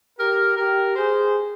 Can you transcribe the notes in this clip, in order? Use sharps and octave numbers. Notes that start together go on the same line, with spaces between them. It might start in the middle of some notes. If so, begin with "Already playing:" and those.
G4 A#4
G4 A#4
G#4 C5